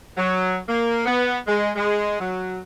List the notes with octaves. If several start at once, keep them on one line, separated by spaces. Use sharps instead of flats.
F#3
A#3
B3
G#3
G#3
F#3